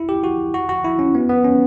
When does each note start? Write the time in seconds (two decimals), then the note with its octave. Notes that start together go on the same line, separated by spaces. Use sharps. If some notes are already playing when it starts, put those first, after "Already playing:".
Already playing: E4
0.09 G4
0.24 F#4
0.54 F#4
0.69 F#4
0.84 E4
0.99 C#4
1.15 B3
1.29 B3
1.44 C#4